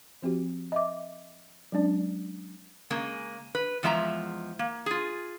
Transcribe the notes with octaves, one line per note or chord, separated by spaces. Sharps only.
F3 C4 F#4 G4
D#5 E5 D6
F#3 G#3 C#4 D4 D5
C#3 G#3 A#3
B4
E2 F3 G#3 E5 A5 A#5
A#3
F4 G#4